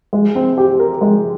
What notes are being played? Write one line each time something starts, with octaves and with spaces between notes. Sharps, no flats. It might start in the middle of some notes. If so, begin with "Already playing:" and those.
G#3
C4
G4
A#4
G#3